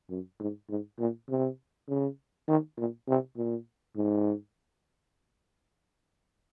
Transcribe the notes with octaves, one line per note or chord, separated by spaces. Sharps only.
F#2
G#2
G#2
A#2
C3
C#3
D#3
A#2
C3
A#2
G#2